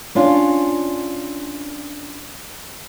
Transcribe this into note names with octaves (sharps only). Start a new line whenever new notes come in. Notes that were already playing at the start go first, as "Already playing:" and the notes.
C#4 D4 F4